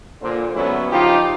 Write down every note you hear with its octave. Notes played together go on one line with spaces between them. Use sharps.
A#2 D3 C5
D3 F#3 G#3 B3 C#4 E4
C#3 F3 D#4 F4 G4